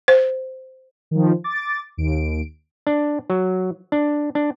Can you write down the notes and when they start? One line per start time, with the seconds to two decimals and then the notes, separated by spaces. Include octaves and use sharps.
0.08 C5
1.11 D#3 F3
1.44 D6 A6
1.97 D#2 D7
2.87 D4
3.30 F#3
3.92 D4
4.35 D4